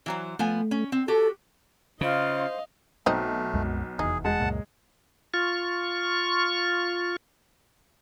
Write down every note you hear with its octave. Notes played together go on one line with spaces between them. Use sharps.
E3 F#3 C5
F3 A3 B3 G#5
C#4
C4
F#4 G4 A4 A5
C#3 F4 C5 D#5 F5
B1 A3 C4 D#4
C2 F#2 G#3
F1 E2 D#4 G#4
G#3 F#5 A5
C#2 F#2 A#2
F4 C#6